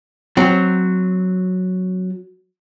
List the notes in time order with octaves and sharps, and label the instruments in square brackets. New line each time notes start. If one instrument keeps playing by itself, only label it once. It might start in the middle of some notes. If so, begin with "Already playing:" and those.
[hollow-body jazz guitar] F#3 C4